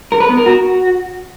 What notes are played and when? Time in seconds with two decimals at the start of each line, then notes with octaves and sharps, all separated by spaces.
0.12 A#4
0.20 B4
0.29 B3
0.37 A#4
0.46 F#4